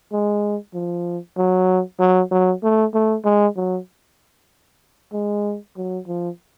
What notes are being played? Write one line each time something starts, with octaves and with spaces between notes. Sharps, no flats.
G#3
F3
F#3
F#3
F#3
A3
A3
G#3
F#3
G#3
F#3
F3